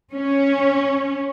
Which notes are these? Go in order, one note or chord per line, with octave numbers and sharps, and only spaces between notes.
C#4